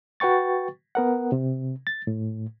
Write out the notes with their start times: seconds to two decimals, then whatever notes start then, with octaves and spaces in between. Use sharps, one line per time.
0.20 F#4 B4 G5 C#6 A6
0.95 B3 A#4 F#5
1.32 C3
1.87 A6
2.07 A2